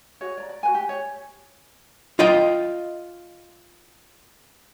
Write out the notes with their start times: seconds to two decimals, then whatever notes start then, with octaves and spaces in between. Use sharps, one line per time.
0.21 F#4 G#4 C#5
0.38 D5 A#5
0.49 D5
0.63 F#4 B4 G#5
0.75 G4
0.89 C#5
2.19 F4 D#5 G5